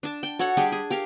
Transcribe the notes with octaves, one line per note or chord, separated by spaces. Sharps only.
D4 A5
G5
F#4 A4 C#5 F#5
G3 D4 G4 G#4
G#4
G4 A#4 F5